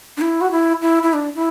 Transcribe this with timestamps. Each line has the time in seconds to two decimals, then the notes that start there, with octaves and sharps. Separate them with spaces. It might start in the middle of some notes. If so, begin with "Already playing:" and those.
0.17 D4
0.21 E4
0.41 F#4
0.51 E4
0.82 E4
1.03 E4
1.13 D4
1.35 E4